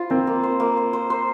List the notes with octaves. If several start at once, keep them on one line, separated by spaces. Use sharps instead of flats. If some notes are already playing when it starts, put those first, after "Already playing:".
Already playing: F4 C5
A#3 C4
A#3
C5
A#3
C5
C5
C5